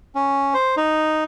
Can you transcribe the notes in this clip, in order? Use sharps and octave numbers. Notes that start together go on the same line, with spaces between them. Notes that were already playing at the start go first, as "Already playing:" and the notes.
C#4
C5
D#4